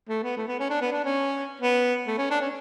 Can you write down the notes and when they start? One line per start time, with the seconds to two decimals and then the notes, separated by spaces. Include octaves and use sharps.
0.09 A3
0.23 B3
0.37 A3
0.48 B3
0.60 C#4
0.70 D4
0.81 B3
0.92 D4
1.04 C#4
1.62 B3
2.07 A3
2.18 C#4
2.30 D4
2.41 C#4